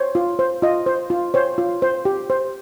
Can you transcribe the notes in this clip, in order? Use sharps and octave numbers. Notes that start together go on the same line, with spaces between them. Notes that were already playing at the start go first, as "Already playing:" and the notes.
Already playing: C5 C#5
F4
C5
F4 D#5
C5
F4
C5 C#5
F4
C5
G4
C5